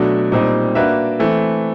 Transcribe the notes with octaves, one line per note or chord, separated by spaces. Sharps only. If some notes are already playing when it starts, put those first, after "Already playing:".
Already playing: B2 F#3 A3 D4
A#2 G3 C4 D#4
A#3 D4 F#4 B4 E5
E3 A3 C4